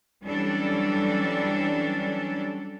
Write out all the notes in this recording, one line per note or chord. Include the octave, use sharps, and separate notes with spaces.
E3 F#3 G3 C#4 D4 A4